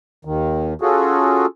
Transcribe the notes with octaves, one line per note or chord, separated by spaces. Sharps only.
D#2 D#3
C#4 F4 F#4 G#4 A4